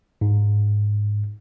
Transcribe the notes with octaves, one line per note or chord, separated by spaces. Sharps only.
G#2